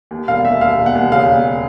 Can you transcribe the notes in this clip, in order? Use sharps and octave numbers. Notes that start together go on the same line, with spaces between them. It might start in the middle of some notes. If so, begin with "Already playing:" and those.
D#2
E1 F5
D#2 E5
D#2 F5
E1
F#5
D#2
C#3 F5
E1